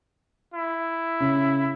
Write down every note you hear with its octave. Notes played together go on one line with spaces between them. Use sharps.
E4
C#3